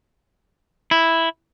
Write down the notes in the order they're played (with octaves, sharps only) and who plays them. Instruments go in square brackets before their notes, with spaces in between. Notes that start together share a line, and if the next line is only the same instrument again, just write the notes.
[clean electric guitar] E4